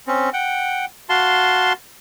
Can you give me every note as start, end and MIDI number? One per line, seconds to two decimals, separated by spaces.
0.07 0.30 60
0.07 0.30 61
0.33 0.85 78
0.33 0.85 79
1.09 1.73 66
1.09 1.73 77
1.09 1.73 81
1.09 1.73 84